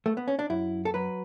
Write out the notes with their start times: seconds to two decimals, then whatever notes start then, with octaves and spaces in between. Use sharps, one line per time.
0.06 A3
0.17 B3
0.28 C#4
0.39 D4
0.50 F#2 E4
0.85 A4
0.94 F#3 B4